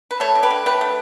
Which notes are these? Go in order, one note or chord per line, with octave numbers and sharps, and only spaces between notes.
B4
A3 A4 C#5
D3
G4 B4
D3
A3 G4 B4
A3